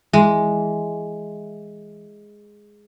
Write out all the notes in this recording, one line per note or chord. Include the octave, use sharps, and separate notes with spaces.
E3 G#3